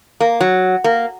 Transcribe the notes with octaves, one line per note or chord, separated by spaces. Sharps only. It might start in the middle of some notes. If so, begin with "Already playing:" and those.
A#3
F#3
A#3